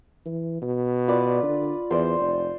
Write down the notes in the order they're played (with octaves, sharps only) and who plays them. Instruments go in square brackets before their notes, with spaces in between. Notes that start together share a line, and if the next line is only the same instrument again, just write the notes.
[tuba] E3
B2
[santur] F4 B4 D5
[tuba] D3
[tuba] E2 [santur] C5 D5
[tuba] F1